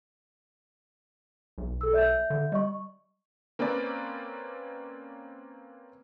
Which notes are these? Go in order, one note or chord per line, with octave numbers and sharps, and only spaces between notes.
B1
A4 E6
D5 E5 G6
D3
G3 D#5 C#6
A#3 C4 C#4 B4 D5